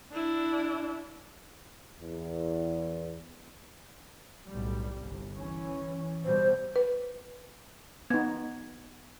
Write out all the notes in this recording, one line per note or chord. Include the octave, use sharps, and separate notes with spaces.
D4 E4
E2
B1 A2 G3
G1 C2
E3 C#4
B2 G3 C5
B4
B3 D#4 G#6